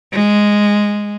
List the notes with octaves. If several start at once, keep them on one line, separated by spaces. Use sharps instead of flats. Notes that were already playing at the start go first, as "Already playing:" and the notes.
G#3